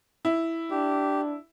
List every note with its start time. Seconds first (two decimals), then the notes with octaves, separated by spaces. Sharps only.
0.25 E4
0.71 D4 G4